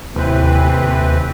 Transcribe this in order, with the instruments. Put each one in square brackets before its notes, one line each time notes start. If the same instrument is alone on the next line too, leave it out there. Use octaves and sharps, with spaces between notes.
[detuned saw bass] D#2 [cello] A2 C3 [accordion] E3 C4 B4